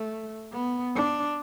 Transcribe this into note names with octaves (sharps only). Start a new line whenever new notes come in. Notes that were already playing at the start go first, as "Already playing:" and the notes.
Already playing: A3
B3
D4